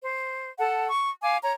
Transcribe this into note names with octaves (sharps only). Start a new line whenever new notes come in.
C5
A4 F#5 A5
C#6
F5 G#5 D6
C#5 A#5